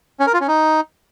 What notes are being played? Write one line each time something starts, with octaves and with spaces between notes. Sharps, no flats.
C#4
A#4
F4
C#4
D#4